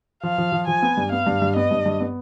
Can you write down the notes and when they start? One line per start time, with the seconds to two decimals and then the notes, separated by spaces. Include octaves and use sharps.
0.23 F3 F5
0.38 F3
0.52 F3
0.67 F3 G#5
0.82 B3
0.97 G2
1.12 B3 F5
1.27 G2
1.42 G2
1.56 B3 D#5
1.71 G2
1.86 G2
2.01 B3